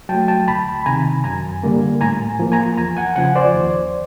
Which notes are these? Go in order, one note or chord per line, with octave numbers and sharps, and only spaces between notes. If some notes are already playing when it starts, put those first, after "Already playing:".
F#3 G5 A5
A3
G5 A5
D2 A5 B5
B5
C3 D#3 G#5 A#5
F#2 G#5 A#5
D3 G3 A#3
A2 G#5 A#5
F3 A#3
G#5 A#5
E2 G#5 A#5
F#5 G#5
C#3 F3 F#5 G#5
C5 D5
D#2